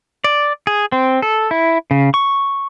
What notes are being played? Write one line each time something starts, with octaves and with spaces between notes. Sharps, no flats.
D5
G#4
C4
A4
E4
C#3
C#6